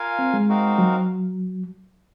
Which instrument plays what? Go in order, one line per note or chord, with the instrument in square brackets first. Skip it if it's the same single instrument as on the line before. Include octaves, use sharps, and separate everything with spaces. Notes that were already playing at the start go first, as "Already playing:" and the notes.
Already playing: [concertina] F4 A#4 F5 G#5
[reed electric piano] C4
G#3
[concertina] C4 D#4 F#4 A#4 F5
[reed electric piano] F#3